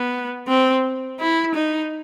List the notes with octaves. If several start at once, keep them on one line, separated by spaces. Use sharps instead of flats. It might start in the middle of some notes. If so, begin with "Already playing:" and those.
Already playing: B3
C4
E4
D#4